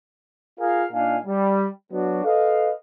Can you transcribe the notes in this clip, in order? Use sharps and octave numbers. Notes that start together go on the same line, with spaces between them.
F4 G#4 A#4 F5
A#2 D4 D#4 F5 G#5
G3
F#3 B3 D4 F#4
A4 B4 D#5 F5